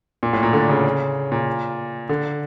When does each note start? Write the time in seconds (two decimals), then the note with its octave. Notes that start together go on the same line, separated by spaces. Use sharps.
0.23 A#2
0.33 A2
0.43 A#2
0.53 D3
0.69 C#3
1.32 A#2
2.09 D3